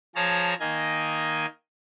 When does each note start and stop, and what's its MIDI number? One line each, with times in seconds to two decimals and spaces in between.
0.15 0.54 53
0.15 0.54 68
0.15 0.54 73
0.15 0.54 81
0.15 0.54 82
0.60 1.46 51
0.60 1.46 58
0.60 1.46 75
0.60 1.46 80